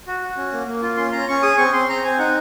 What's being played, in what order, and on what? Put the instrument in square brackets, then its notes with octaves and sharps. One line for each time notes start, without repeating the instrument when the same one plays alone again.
[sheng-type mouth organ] F#4
F#4
C#4
A#3
A#3
F4
C#4 C6
C#4 A#5
C#4 C#6
G#4 D#6
C4 C#6
C4 C6
C4 A#5
C4 G#5
D#4 F#5